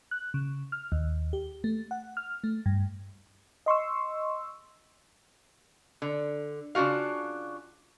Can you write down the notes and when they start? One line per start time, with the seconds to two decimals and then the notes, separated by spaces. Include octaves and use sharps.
0.11 F#6
0.34 C#3
0.72 F6
0.92 D#2
1.33 G4
1.64 A3
1.91 F#5
2.17 F6
2.44 A3
2.66 G2
3.66 D#5 C6 C#6 E6
6.02 D3
6.75 C#3 D4 F4 F#4 F5